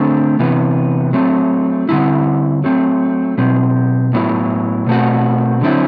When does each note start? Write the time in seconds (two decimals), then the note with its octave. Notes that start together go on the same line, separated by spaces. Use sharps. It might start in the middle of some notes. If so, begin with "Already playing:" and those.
Already playing: D3 A3 C4
0.39 C3 E3 B3
1.13 F#3 A3 C4
1.89 D3 G3 C4 E4
2.64 F#3 A3 C4
3.38 B2 F#3 C4
4.13 A2 F#3 B3 E4
4.87 B2 A3 C4 F#4
5.61 D3 F#3 C4 E4